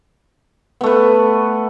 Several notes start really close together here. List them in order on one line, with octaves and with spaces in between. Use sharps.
B3 A3 B4